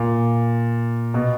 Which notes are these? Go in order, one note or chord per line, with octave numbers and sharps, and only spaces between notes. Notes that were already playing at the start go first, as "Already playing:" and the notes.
Already playing: A#2
B2